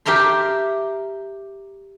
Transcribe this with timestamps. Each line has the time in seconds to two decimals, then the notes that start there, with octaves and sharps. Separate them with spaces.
0.06 G4 A#4 E5 A#5 C6